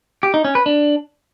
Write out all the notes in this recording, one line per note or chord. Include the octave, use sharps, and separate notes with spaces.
G4
D#4
C#4
B4
D4